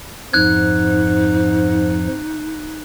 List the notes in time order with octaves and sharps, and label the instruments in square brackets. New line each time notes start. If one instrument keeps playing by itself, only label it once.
[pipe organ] F2 F3 [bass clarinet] G#2 [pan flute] D#4 [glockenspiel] F#6 G#6